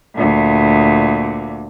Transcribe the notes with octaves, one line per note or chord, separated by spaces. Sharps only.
D2 A#2